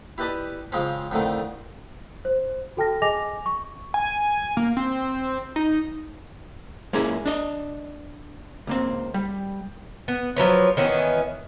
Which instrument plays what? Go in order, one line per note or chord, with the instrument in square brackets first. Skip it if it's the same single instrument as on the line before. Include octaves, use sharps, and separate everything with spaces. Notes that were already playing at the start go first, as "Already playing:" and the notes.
[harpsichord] E4 G4 B4 D5 D#5 A5
C#3 F3 G#3 C4 C#4
F2 A2 D3 D#3 A3
[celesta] C5
F#4 A4 G5 A5 F6 A#6
G#4 D#5 G#5 D6 A#6 F7
C#6
[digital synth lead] G#5
A#3
C4
D#4
[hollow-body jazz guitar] G#3 A#3 C#4 E4 G#4
D4 D#5
C#2 A#3 C4
G3
[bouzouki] B3
F3 F#3 B4 C#5
D#3 E3 B3 C#4